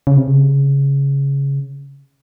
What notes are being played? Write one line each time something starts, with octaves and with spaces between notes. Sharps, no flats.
C#3
C3
C#3